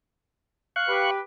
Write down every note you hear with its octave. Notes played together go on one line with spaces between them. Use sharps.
F5 C#6 F#6
G4 B4